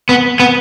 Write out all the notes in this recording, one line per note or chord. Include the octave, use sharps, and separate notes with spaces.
B3
B3